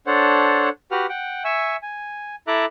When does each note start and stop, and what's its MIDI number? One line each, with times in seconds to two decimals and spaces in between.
0.07 0.69 62
0.07 0.69 69
0.07 0.69 72
0.07 0.69 73
0.07 0.69 78
0.91 1.06 66
0.91 1.06 67
0.91 1.06 71
0.91 1.06 78
0.91 1.06 89
1.09 1.43 78
1.09 1.43 79
1.45 1.76 76
1.45 1.76 80
1.45 1.76 85
1.45 1.76 88
1.83 2.36 80
2.47 2.65 64
2.47 2.65 69
2.47 2.65 76
2.47 2.65 82
2.47 2.65 86
2.47 2.65 90